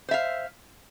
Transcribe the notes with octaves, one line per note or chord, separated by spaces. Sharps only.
C5 E5 F5